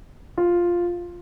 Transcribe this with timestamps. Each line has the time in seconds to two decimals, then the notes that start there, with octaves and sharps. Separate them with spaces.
0.38 F4